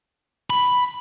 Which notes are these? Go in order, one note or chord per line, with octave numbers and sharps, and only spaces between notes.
B5